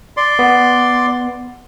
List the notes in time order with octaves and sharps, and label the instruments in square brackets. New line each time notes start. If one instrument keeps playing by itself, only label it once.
[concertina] D5 C6
[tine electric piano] B3